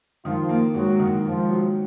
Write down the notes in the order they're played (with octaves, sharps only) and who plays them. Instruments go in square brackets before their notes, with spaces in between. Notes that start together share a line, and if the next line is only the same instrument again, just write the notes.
[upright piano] D#3 [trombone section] F3 F4
[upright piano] A#3
[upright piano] G#2 [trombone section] F#3 F#4
[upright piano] D#3
[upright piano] G#2 [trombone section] F3 F4
[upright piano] F#3